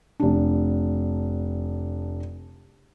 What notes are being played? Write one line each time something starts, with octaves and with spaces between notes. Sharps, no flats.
F1 D4